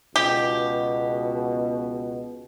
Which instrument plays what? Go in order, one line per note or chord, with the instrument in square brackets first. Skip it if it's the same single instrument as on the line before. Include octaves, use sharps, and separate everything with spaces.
[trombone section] C#2 B2 [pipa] G4